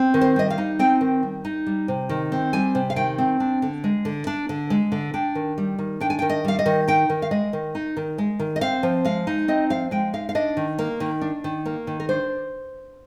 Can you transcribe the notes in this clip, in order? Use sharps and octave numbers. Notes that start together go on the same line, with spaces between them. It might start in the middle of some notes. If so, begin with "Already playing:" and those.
Already playing: C4
D#3
C5
G3 D#5
F5
D#4
C4 G5
D#3
G3
D#4
G3
C3
D#3
C4
G3 G#5
C3
F5
D#3 G5
C4
D4
D3
G#3
D3
D4
D3
G#3
D3
D4 G5
D#3
G3
D#3
D4 G5
G#5
G5
D#3
D#5
G3 F5
D#5
D#3
D#4 G5
D#3
F5
G#3 D#5
D#3
D#4
D#3
G#3
D#3
D#5
C4 F5
F3
G#3 F5
D#4
C4 D#5
F3 F5
G#3 G5
D#4 F5
F5
D4 D#5
D#3
A#3
D#3
D4
D#3
A#3
D#3
A#4
D4 C5